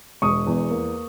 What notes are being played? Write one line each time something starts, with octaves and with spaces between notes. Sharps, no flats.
E1 C#6 D#6
E2
A#3